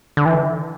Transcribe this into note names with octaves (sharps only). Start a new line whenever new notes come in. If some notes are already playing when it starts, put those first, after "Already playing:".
D3
E3